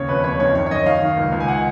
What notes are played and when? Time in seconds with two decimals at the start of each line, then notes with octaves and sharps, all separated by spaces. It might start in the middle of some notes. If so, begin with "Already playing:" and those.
Already playing: D#2 C#3 C#5
0.08 F2 B4
0.24 D#2 C#5
0.39 D#3 C#5
0.55 F#2 C#5
0.66 C#5
0.71 F#2 D#5
0.86 D#3 F5
1.02 D#3
1.17 C#2
1.32 C#2
1.40 G#5
1.48 F#5